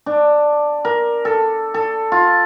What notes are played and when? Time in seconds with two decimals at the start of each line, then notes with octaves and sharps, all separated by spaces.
0.06 D4
0.85 A#4
1.25 A4
1.74 A4
2.12 F4